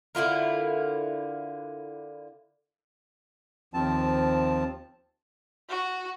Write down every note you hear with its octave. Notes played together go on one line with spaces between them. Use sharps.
D3 E4 F4 A#4
D#2 F3 C4 A5
F#4